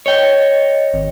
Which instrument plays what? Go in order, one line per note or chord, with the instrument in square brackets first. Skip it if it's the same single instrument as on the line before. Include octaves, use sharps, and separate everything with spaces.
[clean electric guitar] C#5 G5 [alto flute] D#5
[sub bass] G#1